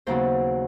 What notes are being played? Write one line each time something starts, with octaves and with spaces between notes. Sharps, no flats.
D#2 C#3 F#3 B3 C5